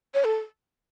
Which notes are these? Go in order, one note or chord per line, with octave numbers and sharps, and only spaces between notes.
C#5
A4